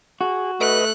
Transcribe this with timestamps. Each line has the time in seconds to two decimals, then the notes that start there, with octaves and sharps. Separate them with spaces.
0.21 F#4 G#4
0.61 A3 B4 D#5 F#6